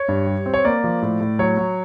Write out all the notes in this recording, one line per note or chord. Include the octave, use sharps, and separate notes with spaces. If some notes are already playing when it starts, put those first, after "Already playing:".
Already playing: C#5
G2
G3
C4
C#5
A#3 D5
F3
A2
A2
F#3 C#5
F#3